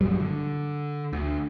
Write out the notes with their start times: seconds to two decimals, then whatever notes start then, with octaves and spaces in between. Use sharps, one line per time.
0.01 B1 G2 F#3 G3
0.20 D3
1.13 D2